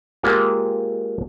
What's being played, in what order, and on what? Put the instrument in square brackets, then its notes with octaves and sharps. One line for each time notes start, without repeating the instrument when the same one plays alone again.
[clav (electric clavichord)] G#3 A#3 C4 F4 G4